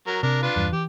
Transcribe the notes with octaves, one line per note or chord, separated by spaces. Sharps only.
F#3 A#4
C3 D4 A#4
D4 F4 B4
E2 G2
E3 G4